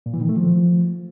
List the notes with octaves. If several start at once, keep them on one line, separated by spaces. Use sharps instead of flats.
A#2
E3
D#3
A3
F3